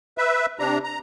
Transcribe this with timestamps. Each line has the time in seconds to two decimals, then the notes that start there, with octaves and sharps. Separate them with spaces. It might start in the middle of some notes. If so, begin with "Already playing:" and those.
0.18 B4 E5
0.59 C3 D4 A#5
0.84 A#5